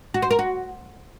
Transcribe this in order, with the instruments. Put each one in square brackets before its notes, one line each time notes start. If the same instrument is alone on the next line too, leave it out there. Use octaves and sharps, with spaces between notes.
[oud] F#4
C5
A#4
F#4